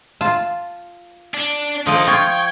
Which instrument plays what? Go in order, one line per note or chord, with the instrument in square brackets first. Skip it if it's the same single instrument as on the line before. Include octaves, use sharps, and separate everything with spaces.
[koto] F4 A5
[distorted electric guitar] D4
[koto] F3 G5 [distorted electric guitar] A#3 D#4 [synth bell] D#6
[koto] F4 [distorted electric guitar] G5 [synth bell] C#6 G#6